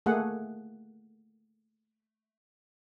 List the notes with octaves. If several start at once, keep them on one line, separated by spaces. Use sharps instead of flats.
A3 A#3 G#4 F#5